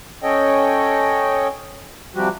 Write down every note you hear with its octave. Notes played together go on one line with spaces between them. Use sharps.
C#4 A4 C#5 D#5 G5
C3 F3 G3 F#4 G4